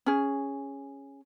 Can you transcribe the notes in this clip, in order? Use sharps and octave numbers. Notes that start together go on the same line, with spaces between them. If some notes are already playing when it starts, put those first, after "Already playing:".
C#4 G#4